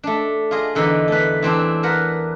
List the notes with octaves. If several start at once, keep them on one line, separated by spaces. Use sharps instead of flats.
A3 D4
F4 G#4 D#5
E2 D3 D#4 B4 D#5
A3 B4
E3 C4 D4
A#4 B4 F#5